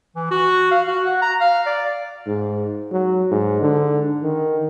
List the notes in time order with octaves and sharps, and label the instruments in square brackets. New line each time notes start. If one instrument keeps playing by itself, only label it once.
[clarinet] E3
F#4
F5
F#4
F#5
A#5
F5
D5
[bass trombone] G#2
F#3
G#2
D3
D#3